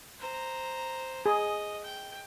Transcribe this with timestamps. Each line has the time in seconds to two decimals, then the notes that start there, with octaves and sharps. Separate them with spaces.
0.19 C5 A#5
1.26 G#4 D#5
1.84 G5